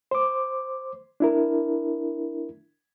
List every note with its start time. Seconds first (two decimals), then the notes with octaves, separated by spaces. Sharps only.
0.11 C5 D6
1.20 D4 E4 A#4